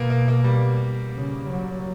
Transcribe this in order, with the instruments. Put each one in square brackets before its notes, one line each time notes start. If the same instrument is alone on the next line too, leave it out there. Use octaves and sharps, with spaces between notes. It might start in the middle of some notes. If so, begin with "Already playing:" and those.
Already playing: [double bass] B2 [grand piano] A#3 B3
[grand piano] A#3
A#3
G3
[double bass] C#3
F#3